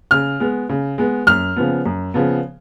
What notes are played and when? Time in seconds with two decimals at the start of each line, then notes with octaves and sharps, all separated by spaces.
0.11 C#3 F6
0.40 G#3 B3
0.69 C#3
0.98 G#3 B3
1.27 F#2 F6
1.56 C#3 F3 B3
1.86 F#2
2.14 C#3 F3 B3